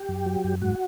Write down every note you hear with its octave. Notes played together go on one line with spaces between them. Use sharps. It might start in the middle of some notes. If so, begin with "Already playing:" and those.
Already playing: G4
F#2
F#3
F#2
G#2 F#4